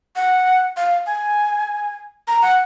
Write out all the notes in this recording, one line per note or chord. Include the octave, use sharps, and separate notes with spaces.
F#5
F5
G#5
A#5
F#5